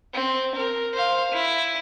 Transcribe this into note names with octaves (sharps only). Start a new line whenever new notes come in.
C4
A#4
C5 F5
E4